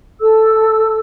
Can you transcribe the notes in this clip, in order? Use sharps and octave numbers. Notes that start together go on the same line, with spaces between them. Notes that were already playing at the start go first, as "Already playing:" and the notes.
A4 E6